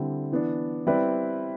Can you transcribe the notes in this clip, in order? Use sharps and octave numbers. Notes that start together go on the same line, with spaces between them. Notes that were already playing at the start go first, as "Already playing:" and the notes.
Already playing: D3 G3 C4 E4
E3 B3 D4
G3 C4 E4 B4 D5